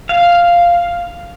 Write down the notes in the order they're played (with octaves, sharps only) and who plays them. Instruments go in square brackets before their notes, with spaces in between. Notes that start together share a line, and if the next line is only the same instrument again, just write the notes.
[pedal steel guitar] F5